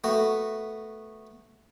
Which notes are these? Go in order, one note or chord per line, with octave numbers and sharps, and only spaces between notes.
A3 B3 F#4